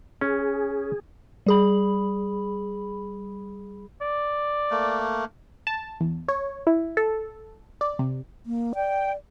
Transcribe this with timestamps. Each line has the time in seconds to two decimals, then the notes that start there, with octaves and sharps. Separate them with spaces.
0.21 C#4 G#4
1.46 G3 G#4 B5
4.01 D5
4.71 A3 A#3
5.67 A5
6.00 E2
6.28 C#5
6.67 E4
6.97 A4
7.81 D5
7.99 C3
8.46 A#3
8.75 D5 G5